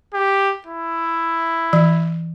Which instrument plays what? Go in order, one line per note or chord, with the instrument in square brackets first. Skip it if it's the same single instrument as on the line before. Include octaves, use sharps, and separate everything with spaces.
[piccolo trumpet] G4
E4
[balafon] E3